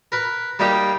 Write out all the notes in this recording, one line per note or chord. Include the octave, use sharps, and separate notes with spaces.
A#4 B4
G3 A#3 D#4 G4